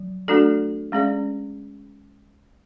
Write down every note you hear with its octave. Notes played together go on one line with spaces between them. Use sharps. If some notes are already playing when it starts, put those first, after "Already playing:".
Already playing: F#3
A3 D4 F#4 A4 D5
G#3 C#4 G#4 D5